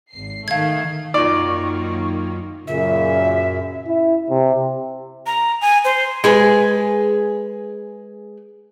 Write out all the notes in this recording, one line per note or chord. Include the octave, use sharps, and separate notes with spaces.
G#1 C7
D#3 A3 F5 G#6
F#2 D#3 A#3 D#4 F4 D5 C#6
F#2 A#2 C#3 E5
E4
C3
A#5
G#5
C5
G#3 G#4 B4